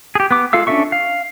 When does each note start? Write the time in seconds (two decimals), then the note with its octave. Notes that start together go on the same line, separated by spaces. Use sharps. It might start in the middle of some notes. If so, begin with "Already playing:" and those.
0.15 G4 G#4
0.31 B3 D6
0.53 G#3 F4 A4 F5 E6
0.67 C#4 D4 A4 E5 C#6
0.92 F5